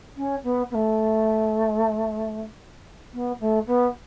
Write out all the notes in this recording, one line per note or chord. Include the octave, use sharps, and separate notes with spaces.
C#4
B3
B3
A3
B3
A3
B3